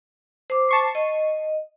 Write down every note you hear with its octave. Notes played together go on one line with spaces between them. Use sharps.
C5 D6
A5 C#6 C7
D#5